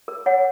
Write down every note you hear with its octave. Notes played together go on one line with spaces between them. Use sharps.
A#4
C#5 F#5